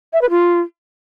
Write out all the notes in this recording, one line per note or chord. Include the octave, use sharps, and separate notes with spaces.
E5
B4
F4